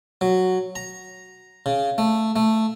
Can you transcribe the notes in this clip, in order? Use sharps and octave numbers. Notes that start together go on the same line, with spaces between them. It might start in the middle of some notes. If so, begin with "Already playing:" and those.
F#3
A#5
C#3
A3
A3